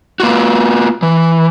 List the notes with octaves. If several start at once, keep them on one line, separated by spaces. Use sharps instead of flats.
A#3 F4 F#4
E3